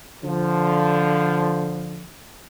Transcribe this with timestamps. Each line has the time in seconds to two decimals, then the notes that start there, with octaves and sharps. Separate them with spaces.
0.24 D3 F3